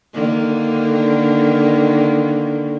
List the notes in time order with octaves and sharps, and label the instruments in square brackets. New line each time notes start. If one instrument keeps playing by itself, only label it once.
[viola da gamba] D3 D#3 A#3